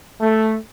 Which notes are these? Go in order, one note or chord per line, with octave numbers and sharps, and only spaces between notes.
A3